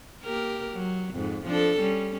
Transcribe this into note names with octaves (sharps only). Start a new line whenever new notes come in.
A#3 G4 A#4
F#3
F2 G#2
F3 D4 A4
G3 C#4